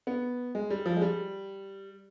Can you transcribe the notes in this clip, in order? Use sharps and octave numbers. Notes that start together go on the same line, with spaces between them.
B3
G#3
G3
F3
G#3
G3